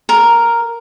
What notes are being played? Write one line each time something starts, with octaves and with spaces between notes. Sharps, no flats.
A#4